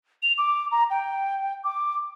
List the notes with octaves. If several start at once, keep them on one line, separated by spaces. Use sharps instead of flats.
F7
D6
A#5
G5
D6